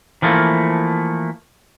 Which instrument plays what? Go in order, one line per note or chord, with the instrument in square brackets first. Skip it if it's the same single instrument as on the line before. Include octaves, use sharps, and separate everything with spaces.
[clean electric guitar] E3 F3 A3 A#3